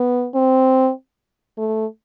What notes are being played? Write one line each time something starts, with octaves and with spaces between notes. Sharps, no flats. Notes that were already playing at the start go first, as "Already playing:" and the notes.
Already playing: B3
C4
A3